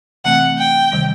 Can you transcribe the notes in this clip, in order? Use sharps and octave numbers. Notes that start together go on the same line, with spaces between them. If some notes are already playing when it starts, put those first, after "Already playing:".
C3 E3 A3 C4 F#5
G5
C3 D#3 G3